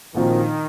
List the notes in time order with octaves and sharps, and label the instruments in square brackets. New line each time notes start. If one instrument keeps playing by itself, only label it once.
[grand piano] A#1 A#2 F3 C4 F#4 [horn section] D#3